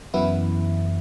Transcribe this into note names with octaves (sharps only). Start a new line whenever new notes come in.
F#2 E3 B3 E4